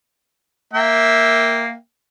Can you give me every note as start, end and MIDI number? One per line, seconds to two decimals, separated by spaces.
0.73 1.74 58
0.73 1.74 76
0.73 1.74 79